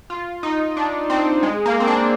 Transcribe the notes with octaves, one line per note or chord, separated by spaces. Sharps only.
F4
D#4
D4
C4
G#3
A#3
C4
D4